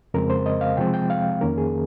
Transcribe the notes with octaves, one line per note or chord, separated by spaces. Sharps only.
F2 C#3 G#3 C4 A#4
C5
D#5
F5
C3 F3 G#3 C4 G5
G5
F5
F2 D#3 A#3 C#4 A#4
G#4